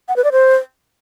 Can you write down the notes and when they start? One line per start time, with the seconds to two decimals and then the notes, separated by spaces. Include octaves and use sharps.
0.08 F#5
0.16 B4
0.24 D5
0.32 C5